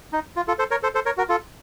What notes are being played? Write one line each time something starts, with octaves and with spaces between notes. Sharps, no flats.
D#4
F4
F4 A4
A4 C5
A#4 C#5
A4 C5
A4 C5
A#4 C#5
F#4 A#4
F4 A4